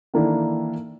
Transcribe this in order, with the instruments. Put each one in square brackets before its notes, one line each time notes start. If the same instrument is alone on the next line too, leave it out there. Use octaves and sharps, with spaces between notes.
[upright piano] D#3 E3 A#3 D4 E4 A4